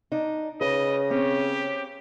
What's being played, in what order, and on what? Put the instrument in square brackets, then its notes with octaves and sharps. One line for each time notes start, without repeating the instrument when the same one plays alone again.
[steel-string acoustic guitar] D4 D#4
[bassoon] C#3 [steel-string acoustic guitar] B4 [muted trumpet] D#5
[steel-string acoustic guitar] C4 C#4 C#5 [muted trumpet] G4